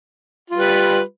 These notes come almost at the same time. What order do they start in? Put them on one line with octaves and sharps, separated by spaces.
F4 G3 B4